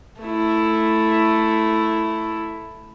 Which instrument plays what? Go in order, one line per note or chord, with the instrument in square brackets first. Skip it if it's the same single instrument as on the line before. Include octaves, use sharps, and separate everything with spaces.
[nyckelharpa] A3 E4